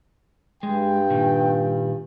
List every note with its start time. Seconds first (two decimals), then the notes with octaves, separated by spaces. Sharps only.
0.63 G2 G#3 G5
1.10 A#2 D#3